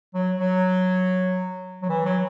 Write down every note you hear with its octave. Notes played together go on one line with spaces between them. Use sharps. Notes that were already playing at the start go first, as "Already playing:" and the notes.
F#3
F#3
F#3
E3
F#3